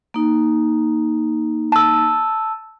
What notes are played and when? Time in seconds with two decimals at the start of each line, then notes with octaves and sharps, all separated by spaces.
0.14 A#3 D#4
1.72 A5 E6